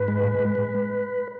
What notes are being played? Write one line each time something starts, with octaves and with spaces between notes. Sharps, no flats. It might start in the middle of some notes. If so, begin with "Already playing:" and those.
Already playing: G#2 B4
G#3
A2
A2
G#3